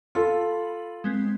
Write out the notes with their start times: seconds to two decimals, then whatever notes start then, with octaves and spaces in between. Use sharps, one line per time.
0.15 F4 A4 B5
1.04 G#3 B3 C4